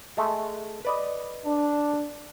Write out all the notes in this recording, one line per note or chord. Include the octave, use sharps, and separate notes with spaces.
G#3 A3
B4 D5 D#5
D4